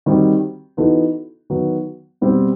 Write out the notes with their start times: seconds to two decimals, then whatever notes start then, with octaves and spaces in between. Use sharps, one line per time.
0.06 D#3 G3 C4 F#4
0.77 E3 B3 D#4 F#4 A4
1.50 D#3 F#3 B3
2.21 B2 G3 C4